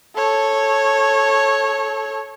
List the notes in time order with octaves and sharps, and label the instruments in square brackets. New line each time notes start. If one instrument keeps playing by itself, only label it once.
[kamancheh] A4 C#5